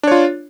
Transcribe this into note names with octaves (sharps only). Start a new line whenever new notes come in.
D4 F4 C#5